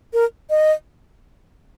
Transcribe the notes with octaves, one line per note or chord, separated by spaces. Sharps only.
A#4
D#5